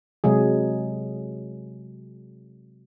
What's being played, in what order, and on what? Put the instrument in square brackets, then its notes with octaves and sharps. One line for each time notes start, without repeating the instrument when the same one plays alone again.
[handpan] C3 F#3 G#3 G#4